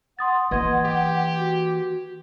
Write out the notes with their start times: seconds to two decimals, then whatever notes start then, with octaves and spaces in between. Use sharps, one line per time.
0.19 F#5 C6 D#6 A6
0.51 E3 A#3 B4 D#5 C6 G#6
0.84 G4
1.37 F#4